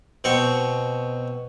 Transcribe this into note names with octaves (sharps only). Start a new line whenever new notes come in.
B2 C4 C#6